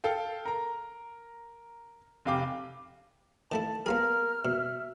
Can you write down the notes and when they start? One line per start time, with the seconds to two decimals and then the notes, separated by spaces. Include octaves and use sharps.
0.04 A4 F5 G5
0.45 A#4 A#5
2.25 F1 C3 F5 G5 D6
3.52 D#3 A3 E4 A5
3.86 B3 F4 G#4 A#4 F6
4.45 B2 E5